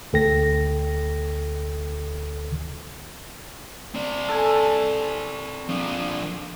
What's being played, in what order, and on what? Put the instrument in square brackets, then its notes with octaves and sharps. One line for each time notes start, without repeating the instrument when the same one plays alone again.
[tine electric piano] D2 A4 G5 A#6
[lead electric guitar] C4 D5
[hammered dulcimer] A4 G#5
[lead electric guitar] F3 D4